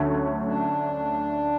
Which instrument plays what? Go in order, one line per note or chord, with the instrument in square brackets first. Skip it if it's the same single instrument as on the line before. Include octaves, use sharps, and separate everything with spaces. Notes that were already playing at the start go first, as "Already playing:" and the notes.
Already playing: [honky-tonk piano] D2 D3 F#3 A3 C#4
[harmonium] D4